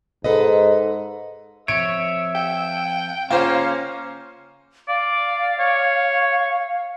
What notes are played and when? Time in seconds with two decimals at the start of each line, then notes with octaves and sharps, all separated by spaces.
0.24 G#2 A4 B4 D#5
1.68 F2 C#5 E5 D7
2.35 G5
3.30 C#3 A#3 C#4 F4 C5 F5
4.88 D5 F5
5.59 C#5